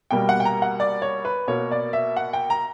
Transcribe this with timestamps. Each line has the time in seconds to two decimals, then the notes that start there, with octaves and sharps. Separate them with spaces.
0.11 B2 G3 A#3 G5
0.29 F#5
0.40 G5
0.45 A#5
0.62 F#5
0.80 D5
1.02 C#5
1.25 B4
1.48 B2 A#3 C#5
1.71 D5
1.93 E5
2.17 F#5
2.33 G5
2.50 A#5